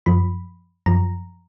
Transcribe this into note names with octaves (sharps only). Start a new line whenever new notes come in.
F#2 F3 B5
F#2 F3 A#5